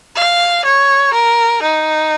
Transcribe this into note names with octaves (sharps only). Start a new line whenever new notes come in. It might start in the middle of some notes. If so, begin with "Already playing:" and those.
F5
C#5
A#4
D#4